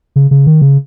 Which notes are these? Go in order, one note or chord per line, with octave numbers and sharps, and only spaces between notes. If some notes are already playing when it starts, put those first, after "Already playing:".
C#3
C#3
D#3
C#3